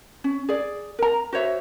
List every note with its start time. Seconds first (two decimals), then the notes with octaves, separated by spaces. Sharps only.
0.24 C#4
0.49 G#4 D5
0.99 A#4 A#5
1.33 F#4 C5 C#5 E5